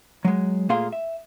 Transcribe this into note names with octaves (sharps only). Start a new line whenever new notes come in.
F#3 G#3
A#2 A3 A#3 G#4 F5 C6
E5